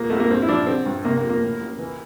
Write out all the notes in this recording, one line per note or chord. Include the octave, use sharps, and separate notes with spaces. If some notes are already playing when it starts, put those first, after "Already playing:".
Already playing: E2 A#2 A#3
A#1 A3
A#3
G2 C4
E4
F3 D4
D3 C4
G2
C3 A#3
A#3
F2
A#3
A2
A1
E3